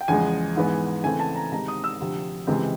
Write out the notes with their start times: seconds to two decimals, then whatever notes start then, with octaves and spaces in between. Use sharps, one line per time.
0.01 G5
0.08 E2 C#3 F3 G#3 G#5
0.56 G#2 E3 G#3 B3
1.04 C#3 E3 A3 C4 G#5
1.20 A5
1.36 A#5
1.52 C3 D#3 G#3 C4 D#4 A#5
1.68 D#6
1.84 E6
2.00 D2 C3 F3
2.47 C#2 C3 E3 G#3 C4